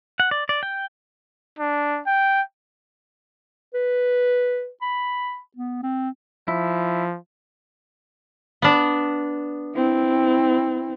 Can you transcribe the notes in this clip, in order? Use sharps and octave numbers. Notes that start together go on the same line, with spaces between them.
F#5
D5
D5
G5
D4
G5
B4
B5
B3
C4
F3 E4
B3 D4
C4 E4